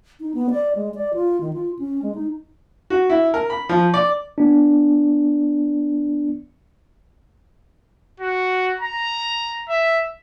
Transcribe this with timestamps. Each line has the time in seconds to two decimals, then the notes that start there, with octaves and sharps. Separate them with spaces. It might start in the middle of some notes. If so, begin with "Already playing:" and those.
0.20 D#4
0.34 B3
0.50 D5
0.75 G#3
0.95 D5
1.14 F4
1.41 D#3
1.53 F4
1.79 C#4
2.02 G#3
2.15 D#4
2.90 F#4
3.10 E4
3.34 A#4
3.50 B5
3.69 F3
3.94 D5
4.38 B3 D4
8.20 F#4
8.80 A#5
9.69 E5